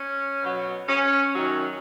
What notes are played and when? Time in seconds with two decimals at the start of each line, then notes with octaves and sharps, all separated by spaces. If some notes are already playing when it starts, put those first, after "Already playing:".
Already playing: C#4
0.42 B2 F#3
0.88 C#4
1.34 F#2 D#3 F#3